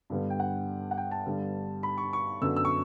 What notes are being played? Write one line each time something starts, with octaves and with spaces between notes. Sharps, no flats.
G2 D3 G3 B3
G5
F#5
F#5
G5
A5
G2 D3 G3 B3
B5
C#6
C#6
F#2 D3 F#3 B3 E6
E6
C#6